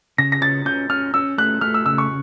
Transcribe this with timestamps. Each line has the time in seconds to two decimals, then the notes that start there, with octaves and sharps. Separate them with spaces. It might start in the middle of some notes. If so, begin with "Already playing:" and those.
0.18 C#3 A#6
0.32 A#6
0.41 C#4 A6
0.65 C#4 G6
0.90 C#4 F6
1.14 C#4 E6
1.38 A3 F#6
1.61 A3 F6
1.74 E6
1.86 C#3 E6
1.98 C#6